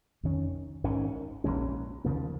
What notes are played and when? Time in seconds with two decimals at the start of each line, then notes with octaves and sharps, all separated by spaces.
0.23 F2 D#3 C#4
0.84 G#1 G#2 D#3 C#4
1.44 A#1 G#2 G#3 C#4
2.04 D#2 C#3 F3 A#3